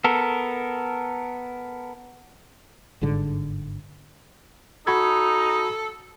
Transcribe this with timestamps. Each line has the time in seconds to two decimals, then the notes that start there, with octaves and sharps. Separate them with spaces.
0.04 B3 A4 A#4
3.01 G1 G#2 D3
4.87 D#4 F#4 A4 B5 G#6